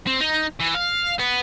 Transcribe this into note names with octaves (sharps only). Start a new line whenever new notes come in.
C4
D#4
E3
F5
B3